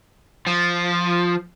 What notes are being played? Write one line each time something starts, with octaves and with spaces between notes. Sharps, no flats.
F3